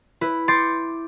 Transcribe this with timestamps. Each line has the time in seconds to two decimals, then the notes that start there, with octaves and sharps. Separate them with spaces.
0.21 E4 B4
0.48 C6 D6 G6 A6 C7 C#7